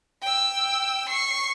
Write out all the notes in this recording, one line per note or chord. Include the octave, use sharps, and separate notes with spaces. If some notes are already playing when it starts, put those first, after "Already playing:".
G5 E6
C#6 C7